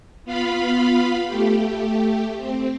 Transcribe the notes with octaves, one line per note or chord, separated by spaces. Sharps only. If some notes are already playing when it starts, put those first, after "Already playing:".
B3 F4 F5 B5
A3 G4
C4